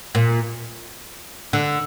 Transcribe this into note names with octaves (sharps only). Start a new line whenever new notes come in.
A#2
D3